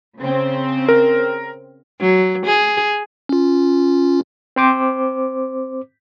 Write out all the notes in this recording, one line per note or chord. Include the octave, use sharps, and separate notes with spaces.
C#3 C4
A#4
F#3
G#4
C#4 F4
C4 C5 D6